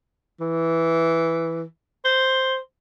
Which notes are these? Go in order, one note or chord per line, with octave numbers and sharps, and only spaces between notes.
E3
C5